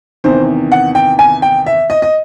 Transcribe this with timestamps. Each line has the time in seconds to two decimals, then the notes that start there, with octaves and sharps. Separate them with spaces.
0.24 E2 C3 D#3 C5
0.72 F#5
0.95 G5
1.19 G#5
1.42 G5
1.66 E5
1.90 D#5
2.02 D#5